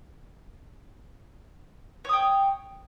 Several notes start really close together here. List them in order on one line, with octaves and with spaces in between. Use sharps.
C#5 D#6 G5